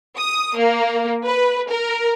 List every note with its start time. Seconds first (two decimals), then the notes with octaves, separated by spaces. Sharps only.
0.18 D#6
0.57 A#3
1.25 B4
1.70 A#4